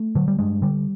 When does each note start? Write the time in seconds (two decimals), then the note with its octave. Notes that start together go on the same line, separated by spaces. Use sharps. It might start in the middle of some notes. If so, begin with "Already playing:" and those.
Already playing: A3
0.15 D3 F#3
0.28 G3
0.39 G2 G#3
0.62 D3 G3